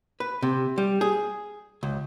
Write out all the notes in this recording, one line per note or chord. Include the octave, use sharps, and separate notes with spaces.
B4
C3
G3
G#4
C#2